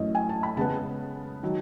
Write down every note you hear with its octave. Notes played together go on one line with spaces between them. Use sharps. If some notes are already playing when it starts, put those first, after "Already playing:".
Already playing: F#2 E3 A3 C#4 D#5
G#5
A5
B5
C#3 G#3 B3 A5
D#3 F#3